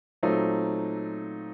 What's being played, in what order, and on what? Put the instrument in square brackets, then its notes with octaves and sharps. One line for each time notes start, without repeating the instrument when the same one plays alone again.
[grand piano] A#2 F#3 A3 C4 D#4